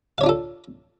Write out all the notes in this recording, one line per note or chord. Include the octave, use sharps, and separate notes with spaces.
D4 F4 A4 C#5 F5